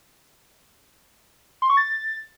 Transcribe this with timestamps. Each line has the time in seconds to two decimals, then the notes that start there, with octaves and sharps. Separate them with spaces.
1.62 C6
1.70 C#6
1.77 A6